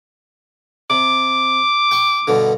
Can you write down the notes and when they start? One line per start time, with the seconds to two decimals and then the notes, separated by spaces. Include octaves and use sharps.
0.90 C3 D6
1.91 G5 C#6
2.27 G2 B2 D3